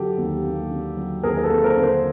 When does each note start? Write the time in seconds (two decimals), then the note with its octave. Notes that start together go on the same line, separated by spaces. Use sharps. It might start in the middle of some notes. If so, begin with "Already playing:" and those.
Already playing: D3 F#3 G4 A4
0.18 D#2
0.44 A#3
0.71 D3
0.97 F#3
1.23 D#2 G#4 A#4
1.37 A#4
1.43 A4 B4
1.50 A#3
1.64 A#4 C5
1.77 D3
1.83 A#4 C5